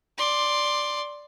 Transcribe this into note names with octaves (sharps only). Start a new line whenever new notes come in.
D5 C6